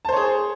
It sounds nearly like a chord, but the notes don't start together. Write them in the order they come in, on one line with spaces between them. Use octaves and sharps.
A5 C5 C#5 G#4